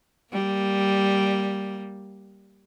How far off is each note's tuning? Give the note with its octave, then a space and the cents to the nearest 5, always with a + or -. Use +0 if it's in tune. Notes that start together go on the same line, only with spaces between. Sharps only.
G3 +0 A#3 +0